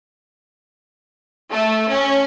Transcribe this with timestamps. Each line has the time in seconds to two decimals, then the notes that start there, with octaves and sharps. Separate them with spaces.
1.51 A3
1.90 C#4